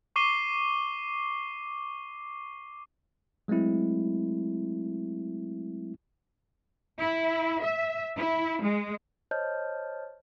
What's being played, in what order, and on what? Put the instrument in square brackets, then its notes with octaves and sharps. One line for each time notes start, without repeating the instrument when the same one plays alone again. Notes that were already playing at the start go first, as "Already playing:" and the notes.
[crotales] C#6 D6 C7 D#7 G7
[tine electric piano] F#3 G#3 A3 C4 E4
[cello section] E4
E5
E4
G#3
[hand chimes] C5 C#5 D#5 A5 F6 G6